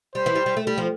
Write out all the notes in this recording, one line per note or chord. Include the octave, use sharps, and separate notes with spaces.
G3 C5
E3
G3
G3
A3
G3
F3